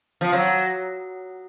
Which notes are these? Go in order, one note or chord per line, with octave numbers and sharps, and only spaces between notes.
F3
F#3